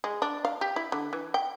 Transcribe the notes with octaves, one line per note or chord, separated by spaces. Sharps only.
G#3
D4
F5
G4
E4
D3
E3
G5